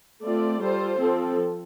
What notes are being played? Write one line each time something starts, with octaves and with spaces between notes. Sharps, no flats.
A3 C4 F4 D5
G3 F4 A4 C5
F3 C4 A4